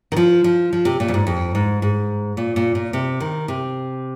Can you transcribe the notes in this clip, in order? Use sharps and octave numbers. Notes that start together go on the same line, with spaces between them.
D#3
F3
F3
F3
C3
A#2
F2
G#2
F2
G#2
G#2
A#2
A#2
A#2
C3
D#3
C3